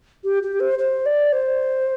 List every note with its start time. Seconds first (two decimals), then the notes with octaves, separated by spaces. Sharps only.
0.24 G4
0.43 G4
0.60 C5
0.79 C5
1.06 D5
1.32 C5